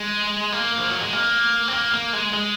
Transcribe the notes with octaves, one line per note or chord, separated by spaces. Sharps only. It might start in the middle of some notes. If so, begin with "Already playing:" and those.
Already playing: G#3
A#3
F3
F#3
G#3
A#3
C4
A#3
A#3
G#3
G#3